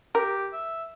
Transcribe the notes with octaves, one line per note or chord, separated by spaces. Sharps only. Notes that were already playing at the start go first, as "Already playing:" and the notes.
G4 A#4
E5